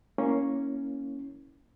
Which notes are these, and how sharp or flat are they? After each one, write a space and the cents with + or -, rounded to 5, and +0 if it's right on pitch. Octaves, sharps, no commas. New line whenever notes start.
A#3 +0 C#4 +0 E4 -25